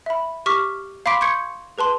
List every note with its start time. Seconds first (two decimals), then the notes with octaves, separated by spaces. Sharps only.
0.06 E5 B5
0.46 G4 C#6 D6 F6 B6
1.06 F5 B5 C6 D6 B6 D7
1.21 C6 C#6 G6 G#6 C#7
1.78 G#4 B4 A5 C6